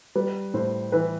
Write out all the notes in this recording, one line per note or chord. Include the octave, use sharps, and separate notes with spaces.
G3 B4
A2 C5
E3 B4